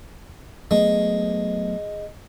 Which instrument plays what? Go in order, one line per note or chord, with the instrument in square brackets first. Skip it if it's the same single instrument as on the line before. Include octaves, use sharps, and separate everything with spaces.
[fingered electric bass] F#3 A3 B3 [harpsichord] G#3